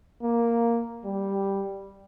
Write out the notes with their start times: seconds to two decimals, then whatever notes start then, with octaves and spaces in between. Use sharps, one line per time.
0.22 A#3
1.05 G3